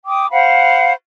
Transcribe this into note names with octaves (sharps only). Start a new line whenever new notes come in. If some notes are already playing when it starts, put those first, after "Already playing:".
G5 D6 D#6
C5 F5 F#5 B5